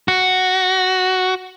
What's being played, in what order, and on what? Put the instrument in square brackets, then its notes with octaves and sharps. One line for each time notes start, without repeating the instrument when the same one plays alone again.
[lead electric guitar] F#4